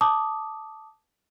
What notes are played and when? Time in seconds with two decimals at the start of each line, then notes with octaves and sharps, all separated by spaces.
0.01 A5 D6 D#6